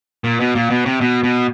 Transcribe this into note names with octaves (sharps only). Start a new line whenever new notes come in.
A#2
B2
A#2
B2
C3
B2
B2